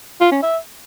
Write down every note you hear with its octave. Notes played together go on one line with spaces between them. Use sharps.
F4
C#4
E5